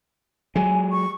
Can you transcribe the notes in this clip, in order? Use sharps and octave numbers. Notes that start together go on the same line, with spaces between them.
F#3 G#3 G#5
C#6